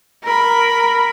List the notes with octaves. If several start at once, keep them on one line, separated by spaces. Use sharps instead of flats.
A#4 B5